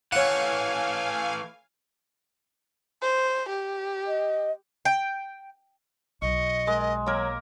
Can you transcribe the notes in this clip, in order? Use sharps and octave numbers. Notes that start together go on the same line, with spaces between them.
E3 A3 C#5 F5 F#5 G#5
C5
G4
D#5
G5
B1 D#5 C#6
G#3 A#4
F#3 A#3 A#4